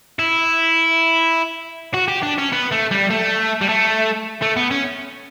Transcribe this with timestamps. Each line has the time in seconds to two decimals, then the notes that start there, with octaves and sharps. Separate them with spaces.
0.19 E4
1.94 F#4
2.08 G4
2.23 D4
2.38 C#4
2.52 B3
2.71 A3
2.91 G3
3.10 A3
3.61 G3
3.68 A3
4.42 A3
4.56 B3
4.71 C#4